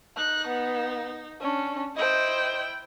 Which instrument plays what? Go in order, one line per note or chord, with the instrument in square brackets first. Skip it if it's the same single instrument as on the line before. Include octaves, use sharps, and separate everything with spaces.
[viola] D#4 [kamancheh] F#6
[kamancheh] B3
C#4 D4
[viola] E4 G5 [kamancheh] C5 D#5